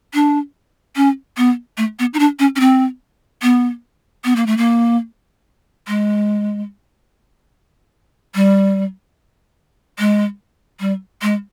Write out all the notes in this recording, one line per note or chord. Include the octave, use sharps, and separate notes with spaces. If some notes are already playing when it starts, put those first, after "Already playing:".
D4
C#4
B3
A3
B3
D#4
D4
C#4
C#4
C4
B3
B3
A#3
A3
A#3
G#3
G3
G#3
G3
G#3